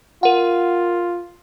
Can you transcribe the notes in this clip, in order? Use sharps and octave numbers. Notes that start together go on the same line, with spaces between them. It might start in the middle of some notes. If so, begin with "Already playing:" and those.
F4 A#4 F#5